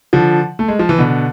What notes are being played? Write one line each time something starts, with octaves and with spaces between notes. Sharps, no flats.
D3 F3
A3
G#3
F3
E3
B2 D3